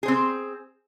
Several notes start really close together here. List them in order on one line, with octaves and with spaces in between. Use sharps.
G#4 C5 C4